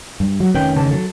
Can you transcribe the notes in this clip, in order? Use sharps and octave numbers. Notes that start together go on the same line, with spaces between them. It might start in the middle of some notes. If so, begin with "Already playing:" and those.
G2
F#3
F1 D#3 C#4 B4 G5
C#3 A5
F#3 A4